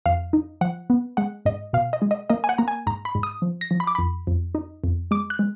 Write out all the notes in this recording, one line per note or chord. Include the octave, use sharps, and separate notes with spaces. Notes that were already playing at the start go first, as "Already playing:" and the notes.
F2 F5
D#4
F3 F#5
B3
G#3 F#5
G#2 D#5
B2 F5
D#5
G#3
D#5
A#3 D#5
G#5
F#5
A#3 A#5
G#5
G#2 A#5
B5
G#2
D#6
F3
A#6
F3
B5
D6
F2 B5
F2
D#4
F2
G#3 D6
F#6
G#3